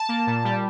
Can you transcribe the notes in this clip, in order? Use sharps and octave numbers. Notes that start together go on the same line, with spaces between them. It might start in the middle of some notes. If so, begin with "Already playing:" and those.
Already playing: A5
A#3
A#2
G3